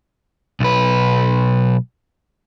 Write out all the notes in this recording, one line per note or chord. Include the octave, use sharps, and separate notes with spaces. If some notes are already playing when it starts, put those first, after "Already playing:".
B1 B4